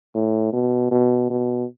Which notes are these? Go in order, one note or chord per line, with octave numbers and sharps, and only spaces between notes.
A2
B2
B2
B2